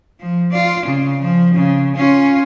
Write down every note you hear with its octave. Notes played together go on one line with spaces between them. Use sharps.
F3
F4 D5
C#3
F3
C#3
C#4 F4